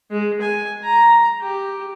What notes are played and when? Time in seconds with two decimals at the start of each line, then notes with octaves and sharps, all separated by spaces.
0.11 G#3
0.41 G#5
0.84 A#5
1.42 G4